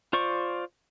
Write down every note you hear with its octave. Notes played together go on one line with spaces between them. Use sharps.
F4 C5 D5 C#6